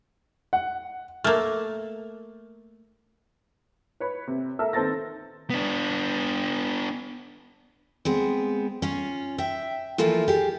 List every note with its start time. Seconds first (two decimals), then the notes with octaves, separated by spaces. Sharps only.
0.53 F#5
1.24 A3 A#3 F6
4.00 B4 C#5 B5
4.27 C3
4.59 A4 A#4 E5 E6
4.73 D#3 C4 A4 B4 A6 A#6
5.50 B3 D4
8.05 G#3 B3 C4
8.82 C#4 F4 C#5
9.38 E5 G5
9.98 E3 F3 A3 A#3 E4 F4
10.28 G4 G#4